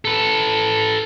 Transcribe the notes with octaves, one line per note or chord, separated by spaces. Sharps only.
A4 B4